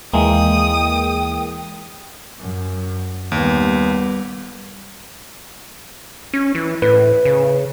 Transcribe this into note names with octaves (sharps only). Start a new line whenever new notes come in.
D#2 E3 G#3 A#3 G5 D#6
F#2
D#2 G3 B3
C#4
E3
A2 B4
C#3